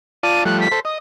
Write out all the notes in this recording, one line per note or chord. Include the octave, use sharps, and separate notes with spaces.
F4 D5 A5 D#7
F3 G3 A3 F#6
B6
A4 C5
D#5 D#6